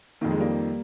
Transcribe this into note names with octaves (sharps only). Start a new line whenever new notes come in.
F2 D#3 A#3
G#3
G3 A#3